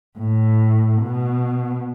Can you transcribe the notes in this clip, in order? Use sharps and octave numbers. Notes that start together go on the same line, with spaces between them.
A2
B2